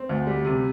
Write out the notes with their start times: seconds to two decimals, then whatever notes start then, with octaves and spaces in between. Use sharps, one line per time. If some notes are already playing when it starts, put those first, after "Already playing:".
Already playing: C4
0.09 D2
0.27 G3
0.45 C3